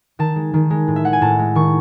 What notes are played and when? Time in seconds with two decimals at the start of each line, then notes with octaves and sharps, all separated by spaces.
0.19 D#3 A5
0.36 G#3
0.54 D#3
0.70 G#3
0.88 A2
0.96 E5
1.04 G#3 F#5
1.13 G#5
1.21 A2 A5
1.39 G#3
1.55 D#3 C#6